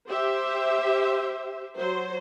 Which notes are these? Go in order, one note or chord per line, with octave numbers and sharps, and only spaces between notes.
G4 C5 E5
F#3 C5